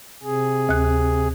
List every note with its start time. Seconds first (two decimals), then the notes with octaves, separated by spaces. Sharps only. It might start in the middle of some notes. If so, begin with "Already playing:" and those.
0.23 C3 G#4
0.69 D2 F#6